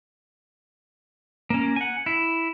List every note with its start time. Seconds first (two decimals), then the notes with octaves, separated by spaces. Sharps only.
1.50 A#3 C#4
1.76 F#5 G#5
2.06 E4